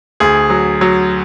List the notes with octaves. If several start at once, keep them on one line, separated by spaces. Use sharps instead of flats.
D2 G#4
F#3
F#3